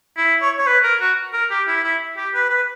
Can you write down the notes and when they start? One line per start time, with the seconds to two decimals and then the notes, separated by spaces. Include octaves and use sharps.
0.17 E4
0.42 C#5
0.59 C#5
0.67 B4
0.84 A#4
1.00 F#4
1.33 A#4
1.50 G4
1.68 E4
1.84 E4
2.17 G4
2.34 B4
2.50 B4